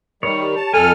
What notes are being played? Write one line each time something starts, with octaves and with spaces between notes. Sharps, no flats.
D#3 G3 C#5
G4
A5
F2 A4 G#5 F6